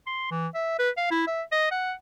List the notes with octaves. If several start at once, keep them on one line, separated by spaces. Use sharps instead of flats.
C6
E3
E5
B4
F5
E4
E5
D#5
F#5